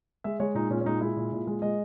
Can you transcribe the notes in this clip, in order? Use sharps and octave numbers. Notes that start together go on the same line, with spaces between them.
G#3 E5
G#3 C#5
A#2 D#4
A#2 C#4
C#4
G#3 D#4
G#3 E4
A#2
A#2
G#3
G#3 D#5